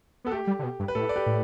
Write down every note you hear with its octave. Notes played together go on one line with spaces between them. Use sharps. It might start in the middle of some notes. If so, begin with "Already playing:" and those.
B3 A4
A3 G4
G3
D3
B2
G2
B4
A2 A4
D5
G4 B4
A2